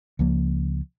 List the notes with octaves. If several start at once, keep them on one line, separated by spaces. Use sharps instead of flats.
C#2 F3 A#3